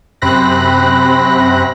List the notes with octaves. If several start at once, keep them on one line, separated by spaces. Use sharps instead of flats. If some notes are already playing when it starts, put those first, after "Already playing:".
F#2 C3 C4 B5 F#6 A#6